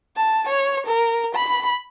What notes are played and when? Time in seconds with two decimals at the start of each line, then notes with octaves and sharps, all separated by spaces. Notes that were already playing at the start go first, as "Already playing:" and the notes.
0.17 A5
0.48 C#5
0.87 A#4
1.35 B5